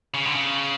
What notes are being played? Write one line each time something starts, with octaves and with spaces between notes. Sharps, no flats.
C#3
D3
C#3